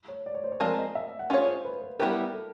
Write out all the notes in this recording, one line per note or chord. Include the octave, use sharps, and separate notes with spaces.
C#5
D5
C#5
C5
C#5
F3 G#3 C4 F4 A#4 D5
D#5
E5
F#5
C#4 F4 G#4 C#5 F5
C5
B4
B4
G3 B3 E4 G4 A#4 B4
A4